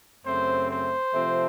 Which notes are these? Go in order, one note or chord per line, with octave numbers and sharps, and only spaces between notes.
F#2 C#3 A3 C4 C5
C5
C3 F3 A3 C4